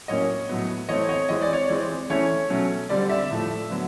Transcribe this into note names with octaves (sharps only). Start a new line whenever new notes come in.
A2 F#3 A#3 C#4 C#5 D#5
A2 F#3 B3
E3 A3 C4 C#5 D#5
C#5 D#5
E3 G#3 C4 D#5
D5
C#5
D5
E3 G#3 C4
E3 A3 C#4 C#5
B2 F#3 A3 C#4
D3 G3 C4 D5
D5 E5
A2 F3 A3
D3 F#3 B3